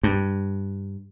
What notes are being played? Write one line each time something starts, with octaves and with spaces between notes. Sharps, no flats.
G2